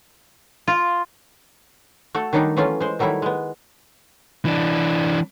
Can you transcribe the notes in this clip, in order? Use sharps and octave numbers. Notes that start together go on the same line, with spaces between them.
F4
A3 F#4 A4
D#3 F#3 G3 D4 D#4
E3 F#3 A3 C#4 F4
G#3 C5
D#3 F#3 G3 A3 E4
G#3 B3
E3 D4